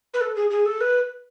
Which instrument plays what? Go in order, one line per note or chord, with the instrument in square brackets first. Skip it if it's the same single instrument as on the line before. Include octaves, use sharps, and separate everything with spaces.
[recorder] B4
A4
G#4
G#4
A4
B4